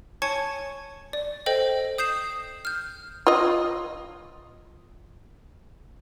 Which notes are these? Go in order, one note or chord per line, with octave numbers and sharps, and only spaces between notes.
C#5 G#5 A5 C#6 G#6 C#7
D5
A4 C5 D#5 G5
D#6 G6 C7 E7
F6 G6
F4 D#5